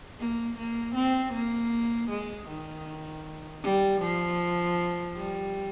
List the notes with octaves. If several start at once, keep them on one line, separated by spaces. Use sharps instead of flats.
A#3
A#3
C4
A#3
G#3
D#3
G3
F3
G3